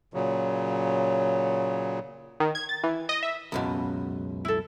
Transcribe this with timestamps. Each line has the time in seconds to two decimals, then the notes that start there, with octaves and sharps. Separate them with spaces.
0.14 A#2 C#3 F#3
2.40 D#3
2.55 G#6
2.69 A6
2.83 E3
3.09 D#5
3.23 E5
3.52 C#2 F#2 B2
4.45 E4 A4